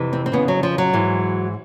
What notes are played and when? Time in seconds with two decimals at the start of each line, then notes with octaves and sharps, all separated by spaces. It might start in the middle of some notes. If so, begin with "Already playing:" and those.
Already playing: F2 C3 E3
0.13 C4
0.26 C4
0.32 F2 C#3 E3 B3
0.48 F#3
0.63 F3
0.78 F#3
0.93 G#2 E3